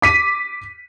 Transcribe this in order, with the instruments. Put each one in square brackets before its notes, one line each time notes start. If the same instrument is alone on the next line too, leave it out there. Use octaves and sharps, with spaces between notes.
[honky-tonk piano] D6 B6 D#7